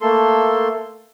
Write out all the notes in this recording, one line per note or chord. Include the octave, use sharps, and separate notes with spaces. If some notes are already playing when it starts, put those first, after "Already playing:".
A3 A#3 A4 C6